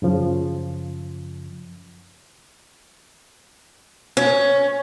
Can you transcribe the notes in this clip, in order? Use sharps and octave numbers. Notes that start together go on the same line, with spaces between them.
F#2 C#3 F3
C#4